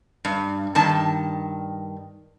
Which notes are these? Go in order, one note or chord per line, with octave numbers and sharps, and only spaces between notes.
G2
G2 D#3 A5